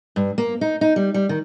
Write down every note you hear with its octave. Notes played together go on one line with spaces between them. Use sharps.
G2
A#3
D#4
D#4
G3
G3
D#3